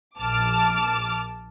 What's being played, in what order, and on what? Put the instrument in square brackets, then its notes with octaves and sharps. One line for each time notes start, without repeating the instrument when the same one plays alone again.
[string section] A#1 A5 D6 F6